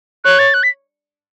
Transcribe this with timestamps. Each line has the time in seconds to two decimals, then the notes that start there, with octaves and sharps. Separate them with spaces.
0.24 C#5 F#6
0.39 A6
0.54 F#6
0.63 B6